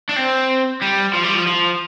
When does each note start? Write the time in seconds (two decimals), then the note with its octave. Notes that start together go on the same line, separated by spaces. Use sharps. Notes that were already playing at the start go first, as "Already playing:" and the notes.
0.09 D4
0.16 C4
0.81 G3
1.14 F3
1.24 G3
1.34 F3
1.47 F3